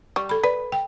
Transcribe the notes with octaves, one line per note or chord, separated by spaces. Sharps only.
G3 C#6
A4 B5
B4 D5
G5